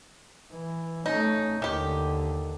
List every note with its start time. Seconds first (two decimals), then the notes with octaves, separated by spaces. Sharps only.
0.52 E3
1.06 A3 C#4 D#4
1.62 D#2 D3 D#3 G4